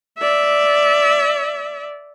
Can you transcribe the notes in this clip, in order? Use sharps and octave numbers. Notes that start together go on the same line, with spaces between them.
D5 E5